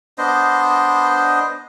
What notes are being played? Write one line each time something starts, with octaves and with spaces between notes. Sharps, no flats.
B3 D4 C5 D#5